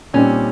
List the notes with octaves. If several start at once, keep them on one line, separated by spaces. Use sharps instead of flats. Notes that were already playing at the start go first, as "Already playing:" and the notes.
A#2 G3 C4 C#4 D#4